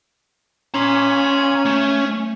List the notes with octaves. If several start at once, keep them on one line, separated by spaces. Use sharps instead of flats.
C#4 A#5 C6
A3